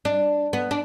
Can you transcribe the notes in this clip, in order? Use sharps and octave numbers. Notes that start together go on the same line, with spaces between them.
D4
B3
D4